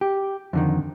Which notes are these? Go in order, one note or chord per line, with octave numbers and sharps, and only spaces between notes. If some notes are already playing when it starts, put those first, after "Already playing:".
G4
F2 D3 D#3